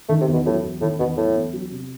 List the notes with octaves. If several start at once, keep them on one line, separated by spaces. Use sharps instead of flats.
D#3 A3
C3
E2
B2
A2 F#3
E2
A2 D#3
E2 B2
A2 F#3
E2
F#3
C3